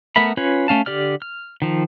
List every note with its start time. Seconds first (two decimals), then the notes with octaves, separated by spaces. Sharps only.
0.16 A3 B3 A#4 E5 B5
0.37 C#4 F4 B4 C#5
0.68 A3 C#4 F5 A5
0.86 D3 G4 D5 F6
1.22 F6
1.62 D#3 F3